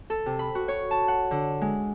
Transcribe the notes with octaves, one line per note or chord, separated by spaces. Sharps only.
A4
C3
B5
F#4
C#5
A5
F#5
D3
G#3